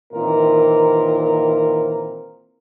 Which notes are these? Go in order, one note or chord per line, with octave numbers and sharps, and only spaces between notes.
A#2 D#3 E3 A#3 C4 A#4